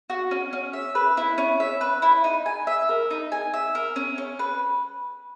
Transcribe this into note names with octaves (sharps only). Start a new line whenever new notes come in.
F#4
C#4
C#4
E5
B4
E4
C#4
E5
B4
E4
D#4
G#5
E5
A#4
D#4
G#5
E5
A#4
C#4
C#4
B4